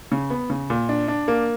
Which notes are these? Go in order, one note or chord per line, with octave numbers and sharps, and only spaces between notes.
C#3
B3
C#3
A#2
D4
D4
A#3